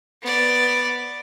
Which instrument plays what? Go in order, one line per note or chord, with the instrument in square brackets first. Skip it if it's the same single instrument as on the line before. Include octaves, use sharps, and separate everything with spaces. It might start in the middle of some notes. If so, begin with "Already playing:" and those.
[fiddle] B3 D5